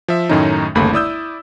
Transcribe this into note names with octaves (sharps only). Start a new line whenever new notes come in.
F3 E5
F#2 A2 D#3 A3 C#4 D#4
G1 D#2 C#3 A3 A#3 B5
E4 D5 D#6 E6 G6